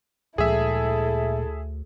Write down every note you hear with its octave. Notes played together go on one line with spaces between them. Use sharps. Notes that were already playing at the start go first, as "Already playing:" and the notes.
D2 A#2 F3 G#3 E4 G#4 A4 E5